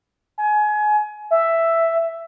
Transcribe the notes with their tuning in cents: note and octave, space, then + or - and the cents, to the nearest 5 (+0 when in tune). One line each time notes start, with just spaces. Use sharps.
G#5 +25
E5 +5